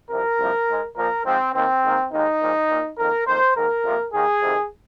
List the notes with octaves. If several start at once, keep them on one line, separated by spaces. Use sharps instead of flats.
C2 C3 F3 A#4
C2 C3 F3 A#3
G#2 G#3
A#2 F3 A#3 A#4
G#2 F3 G#3 C4
D#2 D#3 A#3 C4
G#2 D#3 A#3
D#2 D#3 G#3 D#4
A#2 F3 G#3
A#2 A#3
F2 D#3 A#3 A#4
F2 D#3 A#3 C5
G#2 D#3 A#3 A#4
F2 C3 F3 A#3
D#2 D#3 A#3 G#4
F2 C3 D#3